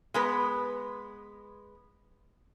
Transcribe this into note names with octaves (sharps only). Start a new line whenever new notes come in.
G#3 B3 B4